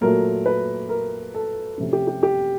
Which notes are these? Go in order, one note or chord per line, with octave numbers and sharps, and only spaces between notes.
A#2 F#3 A3 A#4
B4
A#4
A4
C3 F3 A3 C#4
G4
G4
G4